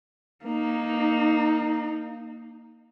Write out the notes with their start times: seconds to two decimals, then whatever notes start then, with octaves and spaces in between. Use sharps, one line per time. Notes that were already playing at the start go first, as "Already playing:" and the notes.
0.44 A#3 D#4